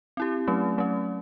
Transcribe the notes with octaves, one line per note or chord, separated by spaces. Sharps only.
C4 E4 G4
F#3 A3 C#4
F#3 A3 C#4